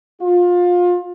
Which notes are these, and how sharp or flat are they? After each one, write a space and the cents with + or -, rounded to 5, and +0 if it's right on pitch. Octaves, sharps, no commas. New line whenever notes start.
F4 +25